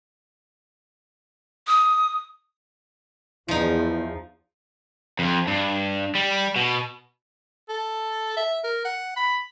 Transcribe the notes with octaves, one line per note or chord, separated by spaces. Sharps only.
D#6
E2 F3 D#4 E4
F2
G2
G3
B2
A4
E5
A#4
F#5
B5